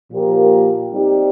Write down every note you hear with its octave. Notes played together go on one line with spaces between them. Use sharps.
A#2 F3 A#3 G4 A#4
G3 C4 D#4 G4